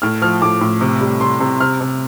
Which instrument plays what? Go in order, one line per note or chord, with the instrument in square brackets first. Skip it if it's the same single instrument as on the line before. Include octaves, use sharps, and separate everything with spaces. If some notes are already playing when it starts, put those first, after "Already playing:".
[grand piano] A2 F6
F3 F6
A2 D6
A2
C3
G3
C3 C6
C3
C3 F6
C3